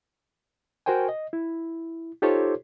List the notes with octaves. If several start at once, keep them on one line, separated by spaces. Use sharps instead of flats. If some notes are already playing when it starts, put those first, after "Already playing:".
F#4 A#4 C5 G5 G#5
D#5
E4
D#4 F4 G4 A4 C5 C#5